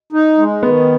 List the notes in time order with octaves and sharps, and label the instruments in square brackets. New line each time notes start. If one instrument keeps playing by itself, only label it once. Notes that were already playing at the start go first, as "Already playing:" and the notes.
[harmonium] D#4
G#3
[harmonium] D#3 [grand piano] B3